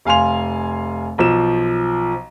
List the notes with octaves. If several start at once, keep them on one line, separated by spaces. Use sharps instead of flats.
F1 F5 G#5 C6 F7
B1 F3 E7